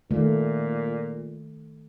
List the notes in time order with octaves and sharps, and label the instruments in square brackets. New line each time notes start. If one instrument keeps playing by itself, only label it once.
[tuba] A#2 [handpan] D#3 A3